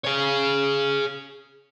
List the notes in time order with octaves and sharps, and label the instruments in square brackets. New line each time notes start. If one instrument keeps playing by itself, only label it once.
[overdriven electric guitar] G#4 C#5